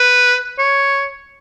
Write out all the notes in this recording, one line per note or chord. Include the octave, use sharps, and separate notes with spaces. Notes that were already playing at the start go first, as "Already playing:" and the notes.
Already playing: B4
C#5